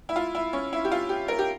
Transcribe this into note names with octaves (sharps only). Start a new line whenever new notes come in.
E4
F4
E4
C#4
E4
G4
F4
G4
A#4
G4